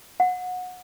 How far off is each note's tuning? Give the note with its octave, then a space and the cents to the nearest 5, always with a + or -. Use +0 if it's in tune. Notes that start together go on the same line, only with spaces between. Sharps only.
F#5 -25